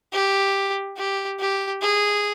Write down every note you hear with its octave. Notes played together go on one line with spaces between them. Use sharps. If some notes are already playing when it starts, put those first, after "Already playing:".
G4
G4
G4
G#4